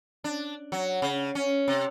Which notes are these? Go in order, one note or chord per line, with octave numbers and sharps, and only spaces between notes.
D4
F#3
C#3
C#4
C3